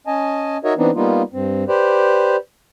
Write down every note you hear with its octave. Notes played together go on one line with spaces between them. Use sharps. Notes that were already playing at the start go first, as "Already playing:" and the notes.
C#4 D#5 G#5 A5
D#4 F#4 A#4 C#5 D#5 E5
E3 B3 C4 D4 D#4
G3 A#3 B3 D#4 F4
G2 C4
G4 B4 C5 D5